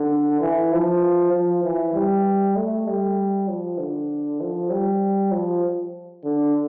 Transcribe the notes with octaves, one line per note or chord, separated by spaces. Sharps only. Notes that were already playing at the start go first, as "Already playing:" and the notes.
Already playing: D3
E3
F3
F3
E3
G3
A3
G3
F3
D3
F3
G3
F3
D3